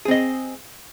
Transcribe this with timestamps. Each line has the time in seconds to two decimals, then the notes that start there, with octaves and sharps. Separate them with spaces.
0.05 G#4
0.08 C4
0.11 D#5